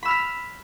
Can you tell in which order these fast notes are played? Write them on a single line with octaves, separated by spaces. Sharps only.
B5 E6 F6 B6